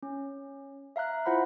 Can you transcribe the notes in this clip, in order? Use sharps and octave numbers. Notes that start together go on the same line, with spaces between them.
C#4
E5 F5 A#5 F#6
E4 F4 C5 F#5 B5